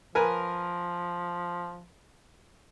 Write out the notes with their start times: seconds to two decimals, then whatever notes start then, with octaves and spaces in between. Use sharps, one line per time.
0.15 F3 A#4 B4 G#5